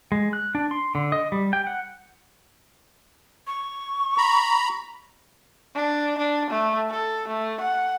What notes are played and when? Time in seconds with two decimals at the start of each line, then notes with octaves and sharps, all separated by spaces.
0.12 G#3
0.33 F#6
0.55 D4
0.71 C6
0.95 D3
1.12 D#5
1.32 G3
1.53 G5
1.67 F#5
3.47 C#6
4.18 A#5 B5
5.76 D4
6.18 D4
6.50 A3
6.90 A4
7.28 A3
7.61 F#5